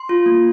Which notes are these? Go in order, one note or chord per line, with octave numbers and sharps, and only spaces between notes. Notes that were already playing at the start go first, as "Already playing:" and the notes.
Already playing: C6
F4
A#3